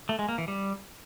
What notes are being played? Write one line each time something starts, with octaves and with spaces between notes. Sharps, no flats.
A3
G#3
A#3
E3
G3